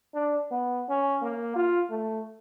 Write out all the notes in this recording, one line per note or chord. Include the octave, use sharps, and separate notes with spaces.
D4
B3
C#4
A#3
F4
A3